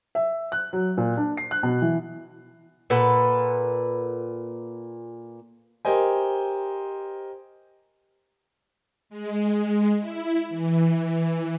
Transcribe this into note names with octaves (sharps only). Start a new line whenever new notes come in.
E5
F#6
F#3
A#2
D4
C7
F#6
B2
E3
A#2 A4 B4 F#5
G4 A#4 C5 D#5 G#5
G#3
E4
E3